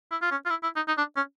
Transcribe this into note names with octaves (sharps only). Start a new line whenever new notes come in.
E4
F4
C#4
F4
E4
E4
D#4
D#4
D4
C#4